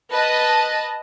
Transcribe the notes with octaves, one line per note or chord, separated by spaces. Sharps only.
B4 D#5 A5